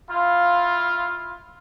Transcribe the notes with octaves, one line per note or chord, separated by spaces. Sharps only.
E4 F4